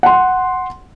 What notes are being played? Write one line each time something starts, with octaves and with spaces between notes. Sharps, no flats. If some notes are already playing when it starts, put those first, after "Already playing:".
F#5 C6